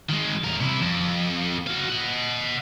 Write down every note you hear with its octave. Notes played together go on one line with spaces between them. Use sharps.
D#3 G#3
E2 A#4
C3 E4
F2
F#4 F5
D#5 F#5